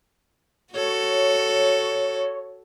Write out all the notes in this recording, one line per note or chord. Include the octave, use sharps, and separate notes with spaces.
F#4 A4 C#5